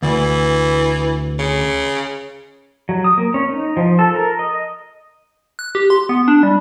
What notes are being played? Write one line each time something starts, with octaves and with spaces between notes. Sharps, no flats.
D2 E3
C#3
F#3
D#6
A#3
C#4
D#4
F3
A4
A#4
D#5
F#6
G4
C6
B3
D4
G3